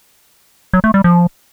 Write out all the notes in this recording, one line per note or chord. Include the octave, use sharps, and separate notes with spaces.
F#3
A3
G3
F3